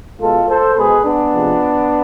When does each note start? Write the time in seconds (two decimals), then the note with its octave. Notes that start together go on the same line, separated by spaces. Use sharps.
0.20 B2 G#3 F4 A4
0.48 A4 C5
0.76 B2 G#3 G#4 B4
1.04 B3 D4
1.33 C3 F3 G#3